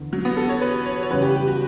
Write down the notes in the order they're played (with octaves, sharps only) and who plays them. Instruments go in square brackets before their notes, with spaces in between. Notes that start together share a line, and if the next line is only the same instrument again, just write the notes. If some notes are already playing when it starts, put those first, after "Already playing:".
Already playing: [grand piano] E2 D3
[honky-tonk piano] F#3
B3
A4
C#5
B4
C#5
C#5
[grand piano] E2 C#3 G3 B3 [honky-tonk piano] B4
[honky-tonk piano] G4
G4
F#4